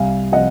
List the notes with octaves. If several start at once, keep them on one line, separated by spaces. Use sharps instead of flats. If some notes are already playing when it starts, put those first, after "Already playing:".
Already playing: C2 F5 G#5
C3 F3 D#5 F#5